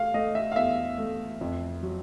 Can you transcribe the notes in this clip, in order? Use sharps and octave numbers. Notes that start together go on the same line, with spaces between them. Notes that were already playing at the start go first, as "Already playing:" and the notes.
Already playing: A3 F5
A3 D#5
E5
F5
E2 E5
A3
F2
F#3